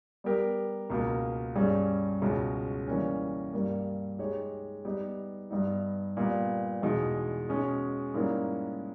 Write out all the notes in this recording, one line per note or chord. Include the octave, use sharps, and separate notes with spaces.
G3 B3 G4 A#4
C#2 B2 A#3
G2 G3 C#4 G#4
C#2 B2 G#3 C#4
E3 G3 A#3 C#4
G2 G3 A#3
G#3 D#4 G4 C#5
G3 B3 D#4 G4
G2 G3 B3 D#4
A#2 G3 B3
E2 B2 G#3 D#4
B2 G#3 C#4 G#4
G#2 G3 A#3 C#4 E4